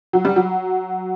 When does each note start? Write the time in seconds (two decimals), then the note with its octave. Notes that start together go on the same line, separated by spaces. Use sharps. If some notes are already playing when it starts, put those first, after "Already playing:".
0.13 F#3
0.25 G3
0.36 F#3